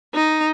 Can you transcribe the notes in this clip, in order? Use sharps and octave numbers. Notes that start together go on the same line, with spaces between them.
D#4